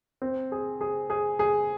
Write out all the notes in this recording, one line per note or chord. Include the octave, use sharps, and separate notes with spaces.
C4
G#4
G#4
G#4
G#4